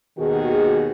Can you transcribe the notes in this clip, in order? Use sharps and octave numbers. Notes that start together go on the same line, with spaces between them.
D#2 B2 D#3 F#4 G#4